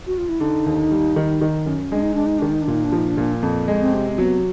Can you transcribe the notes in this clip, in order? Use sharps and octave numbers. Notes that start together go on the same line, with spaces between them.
F#4
F4
E4
D3 D#4
D#2
G3
D#3
D#3
F#2
G#3 D4
D#4
G#3 D4
D#4
D#3 D4
D#4
D4
A#2
D#4
D4
F3 D#4
D4
A#2
F2
G#3
C4
C3
F#3 B3